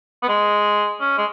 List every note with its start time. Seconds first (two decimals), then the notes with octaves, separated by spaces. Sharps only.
0.23 B3
0.28 G#3
1.00 C#4
1.18 G#3